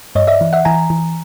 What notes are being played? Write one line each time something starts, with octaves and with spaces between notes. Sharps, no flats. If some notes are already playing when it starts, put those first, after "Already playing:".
G2 C#5 D#5
D5 E5
E3
E5 F#5
E3 G#5 A#5
E3